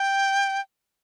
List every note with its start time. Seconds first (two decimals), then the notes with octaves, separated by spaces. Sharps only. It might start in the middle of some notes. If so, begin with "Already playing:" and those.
Already playing: G5